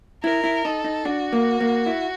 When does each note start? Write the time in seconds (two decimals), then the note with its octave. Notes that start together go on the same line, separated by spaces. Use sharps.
0.24 E4 A#4
0.44 E4
0.64 D#4 A4
0.84 D#4
1.05 D4 F#4
1.33 A#3
1.60 A#3
1.86 E4